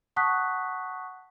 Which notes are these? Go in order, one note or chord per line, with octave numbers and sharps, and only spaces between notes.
F#5 A5 C#6 D#6 F#6 B6